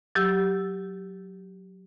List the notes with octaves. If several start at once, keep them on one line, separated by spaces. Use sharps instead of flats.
F#3 G4 E6